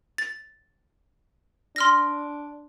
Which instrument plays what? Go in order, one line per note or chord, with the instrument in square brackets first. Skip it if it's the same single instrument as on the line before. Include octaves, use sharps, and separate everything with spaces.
[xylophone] A6
[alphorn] D4 [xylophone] C6 F6 A#6